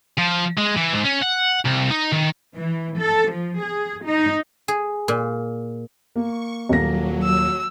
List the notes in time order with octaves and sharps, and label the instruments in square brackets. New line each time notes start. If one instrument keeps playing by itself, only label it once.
[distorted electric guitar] F3
G#3
E3
G#2
C#4
F#5
C2
D#4
D#3
[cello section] E3
A4
F3
G#4
D#4
[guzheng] G#4
A#2
[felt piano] A#3 [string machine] C#6
[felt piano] D#1 A#3 A#6 [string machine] F#3
[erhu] E6